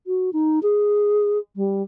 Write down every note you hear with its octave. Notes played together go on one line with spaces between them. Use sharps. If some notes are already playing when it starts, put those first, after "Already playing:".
F#4
D#4
G#4
G3